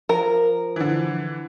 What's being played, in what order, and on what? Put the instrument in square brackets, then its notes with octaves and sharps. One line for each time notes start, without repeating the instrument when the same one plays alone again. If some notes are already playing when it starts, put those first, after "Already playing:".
[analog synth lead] F3 [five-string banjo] A#4
[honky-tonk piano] D3 E3